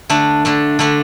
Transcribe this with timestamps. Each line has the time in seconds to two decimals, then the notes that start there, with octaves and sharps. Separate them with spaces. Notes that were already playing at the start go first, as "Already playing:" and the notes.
0.10 D3 A3 D4
0.45 D3 A3 D4
0.79 D3 A3 D4